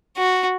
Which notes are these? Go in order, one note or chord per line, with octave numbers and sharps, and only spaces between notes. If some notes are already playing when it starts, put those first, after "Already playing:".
F#4